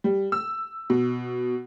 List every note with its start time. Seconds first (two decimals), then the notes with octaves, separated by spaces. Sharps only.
0.04 G3
0.32 E6
0.90 B2